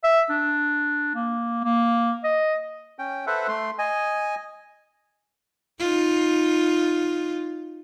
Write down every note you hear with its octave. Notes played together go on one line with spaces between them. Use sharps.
E5
D4
A#3
A#3
D#5
C#4 G5
A4 B4 C5 E5 F#5
A3 C6
D#5 G#5
D#4 F4